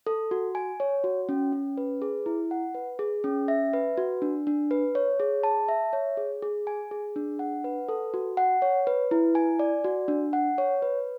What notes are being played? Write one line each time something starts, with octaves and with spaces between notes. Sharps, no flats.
A4
F#4
G#5
C#5
F#4
C#4
C#4
B4
G#4
E4
F#5
B4
G#4
C#4
E5
B4
F#4
D4
D4
B4
C#5
G#4
A5
E5
C#5
G#4
G#4
G#5
G#4
D4
F#5
B4
A4
F#4
F#5
C#5
B4
E4
G#5
D5
F#4
D4
F#5
C#5
B4